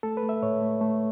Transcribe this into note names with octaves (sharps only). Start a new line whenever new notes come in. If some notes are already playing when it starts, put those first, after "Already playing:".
A3 A4
B4
A3
E5
A2 C#5
A3
A3